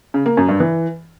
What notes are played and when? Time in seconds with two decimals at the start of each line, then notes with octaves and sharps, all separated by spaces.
0.14 C#3
0.26 A#3
0.37 F#2
0.49 G2
0.60 E3